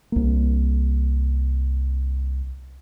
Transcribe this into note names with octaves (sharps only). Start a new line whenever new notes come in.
C2 A#3